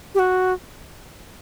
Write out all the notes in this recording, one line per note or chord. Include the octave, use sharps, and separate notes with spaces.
G4
F#4